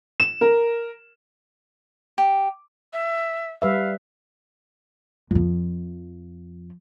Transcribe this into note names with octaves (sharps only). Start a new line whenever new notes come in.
E7
A#4
G4
E5
G3 B4 E5 F5
F2 F3